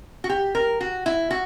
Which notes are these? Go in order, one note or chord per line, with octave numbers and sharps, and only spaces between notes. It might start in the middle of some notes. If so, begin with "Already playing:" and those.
F#4
G4
A#4
F#4
E4
F#4